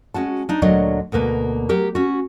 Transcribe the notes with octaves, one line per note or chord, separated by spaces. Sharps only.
G#3 C#4 F#4 A5
D4 D#4
D2 A#2 F#3 D4 C#5 D#5
D2 B2 A#3 B4
F#3 G4 A#4
C#4 F#4